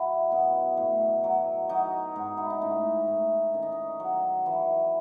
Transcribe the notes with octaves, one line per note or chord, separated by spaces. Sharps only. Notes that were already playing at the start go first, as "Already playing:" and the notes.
Already playing: F#2 F#3 E4 F#4
B2
A2
F#3
F#3 D#4
G#2
E4
D#4
A2 C#4
A2
D#3 C#4
D#4
C#4
F#3
E3